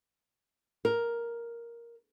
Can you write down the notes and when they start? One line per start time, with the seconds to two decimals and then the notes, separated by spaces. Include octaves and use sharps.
0.85 A#4